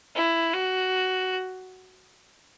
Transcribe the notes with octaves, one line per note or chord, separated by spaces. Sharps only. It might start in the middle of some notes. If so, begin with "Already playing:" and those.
E4
F#4